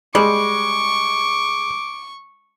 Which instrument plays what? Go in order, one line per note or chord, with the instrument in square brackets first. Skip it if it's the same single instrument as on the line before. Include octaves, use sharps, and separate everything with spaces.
[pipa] G3 [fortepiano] G#3 [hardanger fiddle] C#6 [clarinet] D6